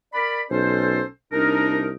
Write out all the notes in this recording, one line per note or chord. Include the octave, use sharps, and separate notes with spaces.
A#4 D5 B5
B1 C#4 A4 C5
C2 D4 D#4 A#4